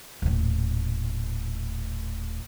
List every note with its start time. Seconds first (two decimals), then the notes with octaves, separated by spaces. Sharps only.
0.22 D#1 A2